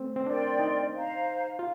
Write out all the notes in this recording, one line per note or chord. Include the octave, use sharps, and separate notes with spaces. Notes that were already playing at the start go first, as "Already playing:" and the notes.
Already playing: A3 C4
C4
D4 A#4 D5 G5 C6
D#4
C5 F5 A#5
F4